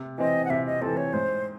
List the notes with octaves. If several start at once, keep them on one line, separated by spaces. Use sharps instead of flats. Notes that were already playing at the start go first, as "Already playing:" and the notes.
Already playing: C3
E3 C4 D#5
F#5
C3 E5
D#5
E3 C4 A4
C#5
G#2 C5